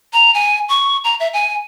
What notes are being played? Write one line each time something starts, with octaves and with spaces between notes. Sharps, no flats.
A#5
G#5
C#6
A#5
E5
G#5